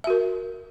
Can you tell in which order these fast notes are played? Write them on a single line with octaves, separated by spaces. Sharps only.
E5 F#4 A#4